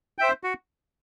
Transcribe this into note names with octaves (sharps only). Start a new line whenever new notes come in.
C5 E5 G5
F#4